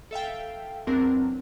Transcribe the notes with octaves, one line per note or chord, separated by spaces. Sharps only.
A4 E5 F5 G5
E2 F#3 C4 D4 A#4